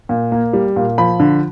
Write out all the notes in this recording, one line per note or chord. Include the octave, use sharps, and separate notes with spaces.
A#2
A#3
G3
A#2
F3 B5
D3